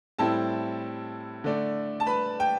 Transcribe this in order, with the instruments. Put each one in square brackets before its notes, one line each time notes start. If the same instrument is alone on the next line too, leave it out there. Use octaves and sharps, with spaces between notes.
[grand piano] A2 G3 C4 E4 A4 A5
D3 A3 D4
A5
B4 B5
G5